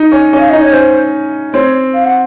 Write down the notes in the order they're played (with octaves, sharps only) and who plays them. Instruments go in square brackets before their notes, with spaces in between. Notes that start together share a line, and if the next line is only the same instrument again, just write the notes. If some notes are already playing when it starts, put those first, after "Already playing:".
Already playing: [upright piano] D#4
C#4
C#4
[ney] F5
[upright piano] D#4 [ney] D#5
[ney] C#5
[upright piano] C#4 [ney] C5
[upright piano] C4 [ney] C#5
[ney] F5
F#5